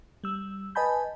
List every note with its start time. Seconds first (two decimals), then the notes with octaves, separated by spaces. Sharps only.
0.24 G3 E6
0.75 B4 D#5 G#5 A5 B5 G6